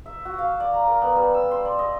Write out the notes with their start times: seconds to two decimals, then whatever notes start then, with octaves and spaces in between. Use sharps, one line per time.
0.06 E5
0.25 F#4
0.38 F5
0.60 D5
0.73 A#5
0.87 A#4
1.02 B3
1.16 G3
1.34 E6
1.51 C6
1.65 D5
1.79 D#5